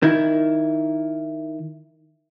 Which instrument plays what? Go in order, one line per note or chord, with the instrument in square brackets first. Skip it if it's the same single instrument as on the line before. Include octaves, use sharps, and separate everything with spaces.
[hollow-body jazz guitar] D#3 E4